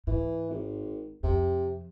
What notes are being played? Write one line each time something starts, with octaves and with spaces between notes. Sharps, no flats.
G#2 E3
G#1
F2 C3